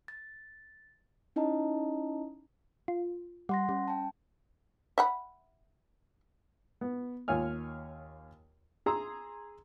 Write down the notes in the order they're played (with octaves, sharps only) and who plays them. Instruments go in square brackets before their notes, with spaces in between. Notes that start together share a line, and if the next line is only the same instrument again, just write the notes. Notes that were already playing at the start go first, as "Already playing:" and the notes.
[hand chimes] A6
C#4 D#4 E4 D#5 A5 A#5
[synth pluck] F4
[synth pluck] G3 [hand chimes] F#5 C6 A#6
[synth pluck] G3 [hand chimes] C#4
[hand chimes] G5 A5
[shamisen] E5 F#5 B5
[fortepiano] B3
D#2 F4 C#5 G#5 F6
G#4 A#5 C6 E6